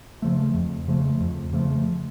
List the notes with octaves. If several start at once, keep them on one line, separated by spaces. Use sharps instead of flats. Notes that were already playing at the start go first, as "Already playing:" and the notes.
C#3 F3 A3
F2
C#3 F3 A3
F2
C#3 F3 A3